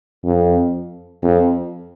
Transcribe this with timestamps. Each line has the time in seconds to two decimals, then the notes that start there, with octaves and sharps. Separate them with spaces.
0.25 F2
1.23 F2